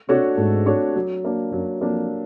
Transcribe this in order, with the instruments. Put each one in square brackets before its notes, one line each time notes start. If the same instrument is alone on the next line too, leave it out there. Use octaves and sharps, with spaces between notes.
[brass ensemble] C3 [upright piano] D4 F#4 A4 C#5
[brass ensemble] G#2 [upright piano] A3
[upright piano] D4 F#4 A4 C#5
F#3
A#3 D4
[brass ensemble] F#2 [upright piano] F#3
[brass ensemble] F2 [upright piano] A#3 D4